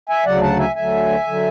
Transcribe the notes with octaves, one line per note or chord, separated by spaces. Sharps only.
E5 G#5
D2 C#3 F#3 D5 F#5
F#5 A5
E5 G#5
D2 D3 F#3 E5 G#5
D3 F#3